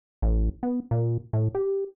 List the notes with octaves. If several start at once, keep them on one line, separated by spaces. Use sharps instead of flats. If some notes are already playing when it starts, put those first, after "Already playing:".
A1
B3
A#2
A2
G4